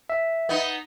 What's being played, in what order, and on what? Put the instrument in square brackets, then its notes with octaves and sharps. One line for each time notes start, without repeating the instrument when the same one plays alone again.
[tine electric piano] E5
[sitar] B3 D#4